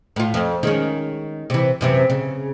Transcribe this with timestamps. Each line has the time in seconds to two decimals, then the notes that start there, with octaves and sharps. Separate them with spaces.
0.16 A2 F4
0.34 F2
0.63 D#3 G#3 C#4
1.50 C3 E3
1.81 F#2 C3 E3
2.10 C#3